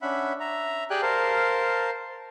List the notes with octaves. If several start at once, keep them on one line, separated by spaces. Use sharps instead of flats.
C#4 D4 E5 F#5 B5
E5 A#5
G4 G#4 D5 G5 G#5 F#6
A#4 C5 F5 A5